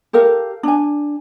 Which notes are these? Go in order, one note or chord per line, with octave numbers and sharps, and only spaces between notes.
G4 A4 A#4 F5
D4 G#5